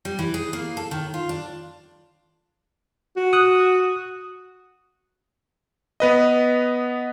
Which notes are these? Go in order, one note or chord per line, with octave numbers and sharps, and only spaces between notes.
G3
E3
G#4
A#3
A4
D#3
F4
D4
F#4
D#6 F#6
B3 B4 D#5